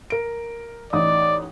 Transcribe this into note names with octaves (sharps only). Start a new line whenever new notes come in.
A#4 D7
A1 D#4 D5 D#6